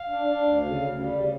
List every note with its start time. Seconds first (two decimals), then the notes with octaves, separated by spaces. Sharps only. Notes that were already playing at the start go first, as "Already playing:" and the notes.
Already playing: F5
0.09 D4
0.26 D4
0.43 D2
0.61 C#3
0.78 D2
0.95 G3
1.12 C#3